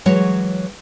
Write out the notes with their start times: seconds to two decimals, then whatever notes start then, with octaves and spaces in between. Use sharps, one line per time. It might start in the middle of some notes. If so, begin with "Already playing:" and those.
0.06 E3 F#3 G#3 C#5